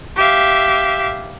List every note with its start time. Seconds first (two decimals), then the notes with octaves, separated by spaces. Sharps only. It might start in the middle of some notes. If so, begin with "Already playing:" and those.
0.17 G4 E5 F5